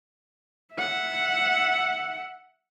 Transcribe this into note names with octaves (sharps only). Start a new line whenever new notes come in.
E5 F#5